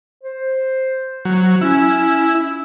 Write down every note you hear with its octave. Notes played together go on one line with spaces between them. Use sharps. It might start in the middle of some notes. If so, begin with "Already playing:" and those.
C5
F#3
C#4 E4